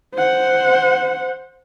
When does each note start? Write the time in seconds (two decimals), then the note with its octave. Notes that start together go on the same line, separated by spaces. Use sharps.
0.15 C5 F#5